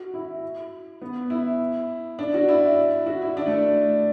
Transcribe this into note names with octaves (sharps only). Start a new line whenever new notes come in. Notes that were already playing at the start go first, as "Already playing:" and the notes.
Already playing: F#4
E4
B3
E4
D4
F#4
E4
F#4
E4
D4
A3